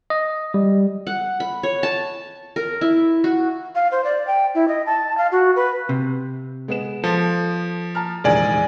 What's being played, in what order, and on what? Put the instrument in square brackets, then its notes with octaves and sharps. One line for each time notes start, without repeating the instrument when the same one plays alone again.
[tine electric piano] D#5
G3
[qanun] F#5
B5
C#5
A5
A#4
E4
F#4
[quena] F5
C5
D5
G5
E4
D#5
A5
F5
F#4
B4
[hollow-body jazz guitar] C3
[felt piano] G#3 B3 E7
[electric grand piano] F3 [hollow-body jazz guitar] A4
[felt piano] A5 A#5 F6
[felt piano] F1 A#1 E2 [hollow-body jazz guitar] D#3 [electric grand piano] G#3 D5 G#5